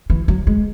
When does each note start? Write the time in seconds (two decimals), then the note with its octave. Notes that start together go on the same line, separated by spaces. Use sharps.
0.10 E3
0.28 F#3
0.47 G#3